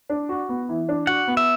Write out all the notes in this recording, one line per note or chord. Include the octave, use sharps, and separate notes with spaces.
D4
F#4
B3
E3
D4
F#4 F#5
B3
E5